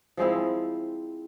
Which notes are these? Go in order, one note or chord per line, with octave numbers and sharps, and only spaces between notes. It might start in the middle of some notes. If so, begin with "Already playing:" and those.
F3 G#3 C4 E4